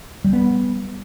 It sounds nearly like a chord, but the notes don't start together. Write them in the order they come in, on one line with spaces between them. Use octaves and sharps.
G3 G#3 B3